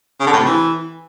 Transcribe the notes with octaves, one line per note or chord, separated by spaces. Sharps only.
C#3
D3
A2
C3
E3